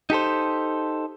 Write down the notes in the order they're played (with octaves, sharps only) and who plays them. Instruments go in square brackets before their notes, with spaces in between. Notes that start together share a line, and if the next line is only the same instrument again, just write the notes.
[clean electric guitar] D#4 G4 A4 C5